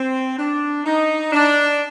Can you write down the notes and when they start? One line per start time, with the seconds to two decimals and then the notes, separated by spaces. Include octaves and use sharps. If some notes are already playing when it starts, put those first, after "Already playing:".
Already playing: C4
0.39 D4
0.86 D#4
1.33 D4